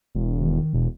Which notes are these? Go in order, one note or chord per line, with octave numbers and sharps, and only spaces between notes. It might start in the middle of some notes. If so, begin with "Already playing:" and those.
E1
D#3
E1 B2